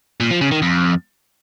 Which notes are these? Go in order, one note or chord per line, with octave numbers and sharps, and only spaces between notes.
A#2
F3
C#3
D#3
F2